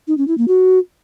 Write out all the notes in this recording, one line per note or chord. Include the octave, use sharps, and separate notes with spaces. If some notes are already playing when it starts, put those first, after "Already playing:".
D#4
C#4
E4
A#3
F#4